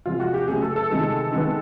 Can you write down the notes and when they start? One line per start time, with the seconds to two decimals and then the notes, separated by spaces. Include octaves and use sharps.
0.06 C3 F3 G#3 F4
0.20 F#4
0.34 G4
0.47 C#3 F#3 A3 G#4
0.62 A4
0.76 A4
0.89 C3 D#3 G#3 B3
1.32 D#3 G#3 B3